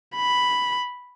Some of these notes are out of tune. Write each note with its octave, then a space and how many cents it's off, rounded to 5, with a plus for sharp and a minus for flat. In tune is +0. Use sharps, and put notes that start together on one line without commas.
B5 +0